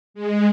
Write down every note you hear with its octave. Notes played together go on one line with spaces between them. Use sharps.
G#3